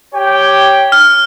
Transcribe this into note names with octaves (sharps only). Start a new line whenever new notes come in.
G4 C#5 G5
F6